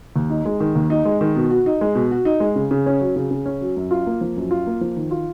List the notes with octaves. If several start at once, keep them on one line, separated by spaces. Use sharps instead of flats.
D#2
D#4
G#3
D#3
D#2
D#4
G#3
D#3
B2
F#4
D#4
G#3
B2
F#4
D#4
G#3
C#3
C#3
C#4
F#3
C#3
C#3
C#4
F#3
F#2
F4
A#3
F3
F#2
F4
A#3
F3
D#3
F4